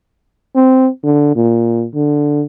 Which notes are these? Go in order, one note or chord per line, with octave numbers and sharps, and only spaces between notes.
C4
D3
A#2
D3